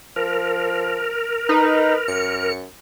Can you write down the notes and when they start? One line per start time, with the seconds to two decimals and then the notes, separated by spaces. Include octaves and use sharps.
0.16 F3 A#4
1.49 D#4 B4
2.08 F#2 C#7